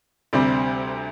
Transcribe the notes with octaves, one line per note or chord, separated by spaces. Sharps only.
D2 C3 G3 C4